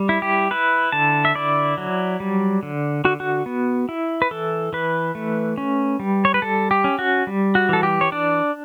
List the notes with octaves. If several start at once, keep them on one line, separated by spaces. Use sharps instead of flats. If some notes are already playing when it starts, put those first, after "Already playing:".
Already playing: G3
E4
G4
E4 B4
D3 A5
E5
E4 D5
F#3
G3
D3
D3 F#4
F#4
B3
E4
B4
E3 A4
E3 B4
A3
C#4
G3
C#5
B4
G3 A4
G4
C#4
F#4
G3
F#4
E3 A4
G4
C#5
D4 D5